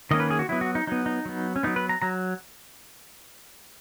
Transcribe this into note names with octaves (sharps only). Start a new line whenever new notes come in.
D#3 A#3 C#4 D#5
B4
G#4
F#4
F#3 B3 E4
F#4
D#4
F#3 B3 D#4
D#4
F#3 B3
C#4
F#3 B3 D#4
B4
A#5
F#3 A#5